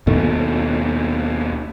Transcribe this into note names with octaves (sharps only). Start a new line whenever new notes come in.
D#2 B2 A3